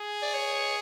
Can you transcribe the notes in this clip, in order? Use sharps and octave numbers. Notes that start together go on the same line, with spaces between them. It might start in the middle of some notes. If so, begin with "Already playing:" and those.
Already playing: G#4
D5
C#5